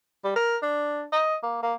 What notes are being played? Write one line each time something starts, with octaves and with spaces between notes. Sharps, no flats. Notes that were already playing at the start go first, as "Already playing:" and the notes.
G3
A#4
D4
D#5
A#3
A#3